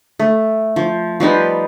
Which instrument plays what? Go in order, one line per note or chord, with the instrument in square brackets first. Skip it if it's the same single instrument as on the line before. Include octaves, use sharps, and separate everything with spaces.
[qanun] A3
F3
F3 G3 D#4 B4